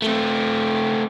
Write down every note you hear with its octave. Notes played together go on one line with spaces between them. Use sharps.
A3 C4